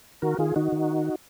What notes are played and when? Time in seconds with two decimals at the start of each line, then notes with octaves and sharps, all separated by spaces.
0.22 D#3 F#4 A#4
0.38 D#3 F4 G#4
0.56 D#3 D#4 F#4
0.72 D#3